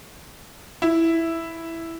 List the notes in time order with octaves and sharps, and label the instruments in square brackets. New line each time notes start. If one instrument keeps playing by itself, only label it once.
[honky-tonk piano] E4